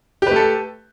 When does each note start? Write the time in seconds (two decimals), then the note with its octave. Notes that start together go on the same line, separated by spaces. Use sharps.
0.22 G4
0.27 B4
0.31 A3
0.36 A4